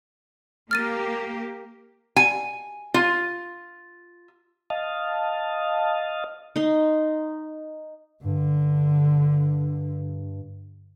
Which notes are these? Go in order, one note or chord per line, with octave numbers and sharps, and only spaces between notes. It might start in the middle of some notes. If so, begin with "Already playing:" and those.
A#3 G4 F6 A6 D#7
G#5
F4
D#5 F5 A5
D#4 C6
G2 D3